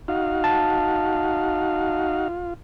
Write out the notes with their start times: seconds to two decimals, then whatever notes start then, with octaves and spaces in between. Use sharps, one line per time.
0.08 D#4 F#4 F5
0.44 A5
2.29 F4